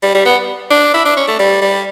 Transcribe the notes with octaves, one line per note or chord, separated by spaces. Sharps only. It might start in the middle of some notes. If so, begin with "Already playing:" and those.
G3
G3
B3
D4
E4
D4
C#4
A3
G3
G3